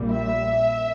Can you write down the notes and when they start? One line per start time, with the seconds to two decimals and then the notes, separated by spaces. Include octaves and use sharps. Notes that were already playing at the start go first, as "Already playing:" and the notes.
Already playing: A#1 A#2 G3
0.11 E5